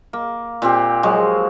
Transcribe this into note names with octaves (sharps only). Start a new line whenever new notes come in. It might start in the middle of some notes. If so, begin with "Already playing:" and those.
A#3
A#2 C4 G4
F3 F#3 G#3